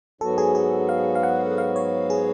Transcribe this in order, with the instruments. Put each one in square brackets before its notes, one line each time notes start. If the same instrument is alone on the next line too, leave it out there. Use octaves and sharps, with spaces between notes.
[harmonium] G#2 F#3 B3 F#4 [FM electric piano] A4
[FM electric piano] G#4
G#4
F5
F5
F#5
F5
C#5
G#4